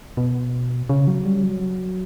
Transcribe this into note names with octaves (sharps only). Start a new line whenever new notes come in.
B2
C#3
F#3
G3
F#3